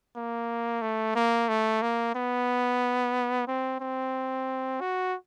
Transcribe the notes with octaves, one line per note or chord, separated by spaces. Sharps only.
A#3
A3
A#3
A3
A#3
B3
C4
C4
F#4